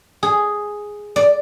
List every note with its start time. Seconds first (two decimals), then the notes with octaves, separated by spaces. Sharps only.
0.23 G#4
1.16 D5